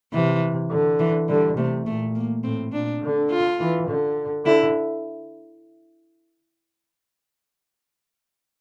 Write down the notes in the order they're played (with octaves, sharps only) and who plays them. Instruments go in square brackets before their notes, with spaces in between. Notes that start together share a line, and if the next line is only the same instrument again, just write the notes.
[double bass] C3 [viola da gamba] E3
[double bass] D3
[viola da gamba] E3
[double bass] D3 [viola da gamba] G3
[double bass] C3 [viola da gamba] A3
[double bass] A#2 [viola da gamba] A3
[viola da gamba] A#3
[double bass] A2 [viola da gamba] C4
[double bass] A#2 [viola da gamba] D4
[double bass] D3
[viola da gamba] F4
[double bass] E3
D3
[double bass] D3 [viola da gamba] E4